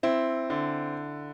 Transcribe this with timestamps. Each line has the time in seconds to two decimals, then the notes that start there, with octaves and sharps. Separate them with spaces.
0.03 C4 E4
0.50 D3